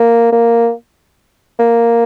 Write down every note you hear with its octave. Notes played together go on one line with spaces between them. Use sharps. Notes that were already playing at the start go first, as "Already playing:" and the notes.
Already playing: A#3
A#3
A#3